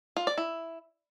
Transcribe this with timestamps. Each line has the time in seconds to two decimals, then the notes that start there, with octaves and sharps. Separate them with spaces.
0.17 F4
0.27 D5
0.38 E4